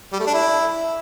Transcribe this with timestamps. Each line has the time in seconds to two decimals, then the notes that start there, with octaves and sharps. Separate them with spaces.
0.13 G3
0.20 A3
0.27 D4
0.33 E4